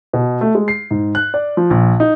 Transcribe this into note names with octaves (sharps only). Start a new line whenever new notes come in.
B2
A3
G#3
C7
G#2
F#6
D5
F3
A#1
D#4